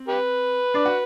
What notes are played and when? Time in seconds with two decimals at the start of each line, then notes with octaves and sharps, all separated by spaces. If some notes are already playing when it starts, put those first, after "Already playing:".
Already playing: C4
0.08 G4 B4
0.74 D4 D5
0.85 F#4 F#5